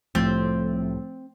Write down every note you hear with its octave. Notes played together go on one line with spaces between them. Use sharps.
C2 A2 F3 A3 C4